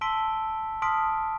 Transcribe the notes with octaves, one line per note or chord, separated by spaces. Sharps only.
A5 C6 E6 B6 D7 G7
A5 C6 D#6 F6 B6 D7